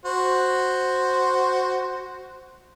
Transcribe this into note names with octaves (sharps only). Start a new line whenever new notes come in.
F#4 C5